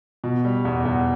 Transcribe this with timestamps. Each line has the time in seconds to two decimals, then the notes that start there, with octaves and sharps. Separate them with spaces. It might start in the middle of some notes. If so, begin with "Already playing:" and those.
0.24 B2
0.44 G3
0.65 E2
0.85 E2